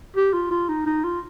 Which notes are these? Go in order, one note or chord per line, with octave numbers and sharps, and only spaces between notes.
G4
F4
F4
D#4
D#4
F4